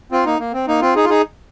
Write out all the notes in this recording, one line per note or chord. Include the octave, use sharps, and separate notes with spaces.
C4 F4
A#3 D#4
A#3
C4
A#3 D#4
C4 F4
D#4 G#4
F4
D#4 G#4